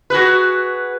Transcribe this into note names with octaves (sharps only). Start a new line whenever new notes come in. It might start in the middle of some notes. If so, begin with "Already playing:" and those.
F#4 G#4 B4